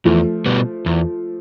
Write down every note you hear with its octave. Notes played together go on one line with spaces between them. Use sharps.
E2 F3 A3
B2 G3 B3
E2